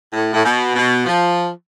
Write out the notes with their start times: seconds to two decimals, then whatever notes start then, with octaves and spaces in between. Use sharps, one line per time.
0.13 A2
0.33 A2
0.44 B2
0.75 B2
1.06 F3